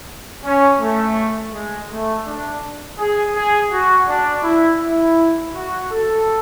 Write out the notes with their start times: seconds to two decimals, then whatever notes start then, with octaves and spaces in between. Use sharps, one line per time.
0.43 C#4
0.80 A3
1.53 G#3
1.89 A3
2.25 D4
2.98 G#4
3.34 G#4
3.70 F#4
4.07 D4
4.43 E4
4.80 E4
5.53 F#4
5.89 A4